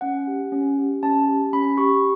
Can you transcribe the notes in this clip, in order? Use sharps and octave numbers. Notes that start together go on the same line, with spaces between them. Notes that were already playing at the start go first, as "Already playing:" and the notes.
C#4 F#5
G4
C#4
G4
C#4 A5
G4
C#4 B5
G4 C#6